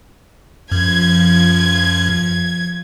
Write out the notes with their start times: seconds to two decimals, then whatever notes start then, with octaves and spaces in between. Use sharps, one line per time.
0.72 F#2 F3 G#6